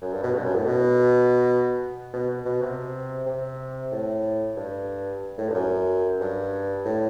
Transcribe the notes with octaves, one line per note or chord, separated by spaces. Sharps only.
F#2
G2
B2
G2
F#2
A2
B2
B2
B2
C3
C3
A2
G2
A2
G2
F#2
G2
A2